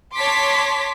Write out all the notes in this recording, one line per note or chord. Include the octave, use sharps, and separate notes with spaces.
C#5 A5 C6 D6 B6